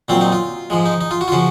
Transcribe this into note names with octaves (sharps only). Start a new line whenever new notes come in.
A#2 F#3 C4 F4
D#4
F4
G#2 F3 G#3
D#4
D#4
F4
F#4
F4
C#3 F3 F#4